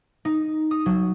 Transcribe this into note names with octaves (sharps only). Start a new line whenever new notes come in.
D#4
D#6
F#3